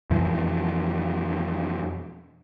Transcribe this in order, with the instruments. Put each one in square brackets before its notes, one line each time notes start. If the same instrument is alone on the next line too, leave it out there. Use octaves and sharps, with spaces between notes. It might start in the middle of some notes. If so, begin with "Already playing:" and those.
[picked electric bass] F2 B2 E3 F3